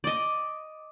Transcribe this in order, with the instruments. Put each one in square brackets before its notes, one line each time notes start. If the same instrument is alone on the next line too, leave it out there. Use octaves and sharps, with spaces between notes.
[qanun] D5 D#5